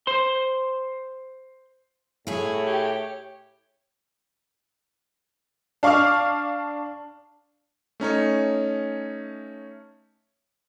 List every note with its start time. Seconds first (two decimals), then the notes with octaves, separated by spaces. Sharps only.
0.07 C5 C6
2.27 A2 E4 G#4 C#5
2.66 G4
5.83 D4 F5 C#6 D6 F6
8.00 A3 C#4 D#4 C#5